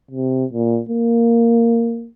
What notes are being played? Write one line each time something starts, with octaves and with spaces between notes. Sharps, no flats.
C3
A#2
A#3